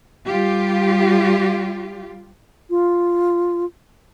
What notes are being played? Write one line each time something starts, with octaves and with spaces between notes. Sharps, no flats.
G3 F4 G4
F4